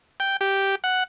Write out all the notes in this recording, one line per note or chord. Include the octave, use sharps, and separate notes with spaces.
G5
G4
F#5